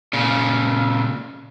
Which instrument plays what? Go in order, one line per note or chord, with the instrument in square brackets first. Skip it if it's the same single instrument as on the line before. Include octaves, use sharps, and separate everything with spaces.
[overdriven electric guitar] A#2 C#3